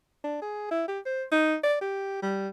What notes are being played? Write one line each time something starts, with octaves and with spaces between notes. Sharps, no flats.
D4
G#4
E4
G4
C5
D#4
D5
G4
G3